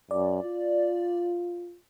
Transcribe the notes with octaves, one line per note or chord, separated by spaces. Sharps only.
F#2 D5
F4